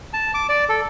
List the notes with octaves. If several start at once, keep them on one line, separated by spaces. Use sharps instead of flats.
A5
D6
D5
A4